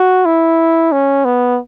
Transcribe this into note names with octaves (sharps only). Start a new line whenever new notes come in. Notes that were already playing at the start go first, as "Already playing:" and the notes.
Already playing: F#4
E4
C#4
B3